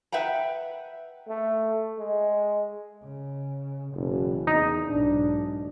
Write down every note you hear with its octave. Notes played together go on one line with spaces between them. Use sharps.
B4 E5 F#5 G5 A#5
A3
G#3
C#3
F#1 B2 E3
E2 D#4
B1 G#2 D4